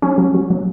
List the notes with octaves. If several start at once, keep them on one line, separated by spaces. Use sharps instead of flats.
F#3 C#4
F#3
F#3
F#3